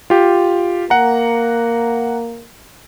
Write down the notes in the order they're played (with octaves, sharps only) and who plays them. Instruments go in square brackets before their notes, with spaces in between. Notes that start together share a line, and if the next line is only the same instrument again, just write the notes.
[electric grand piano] F4 G4
[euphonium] A#3 [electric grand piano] F#5 A#5